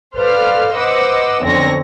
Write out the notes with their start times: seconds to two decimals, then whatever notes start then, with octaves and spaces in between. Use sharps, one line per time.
0.16 A4 B4 C5 D5 F5 F6
0.73 B4 C5 D#5 F#5 D6 E6
1.42 B1 F2 D3 C4 C#5 A#6